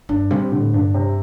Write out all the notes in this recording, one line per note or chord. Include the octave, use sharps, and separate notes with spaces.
G2 D4
C3 G3
A2 D3
G2 D4
C3